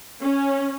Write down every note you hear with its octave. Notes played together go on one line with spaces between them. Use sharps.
C#4